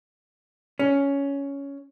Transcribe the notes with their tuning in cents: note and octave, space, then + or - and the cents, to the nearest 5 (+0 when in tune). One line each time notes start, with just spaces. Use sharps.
C#4 +10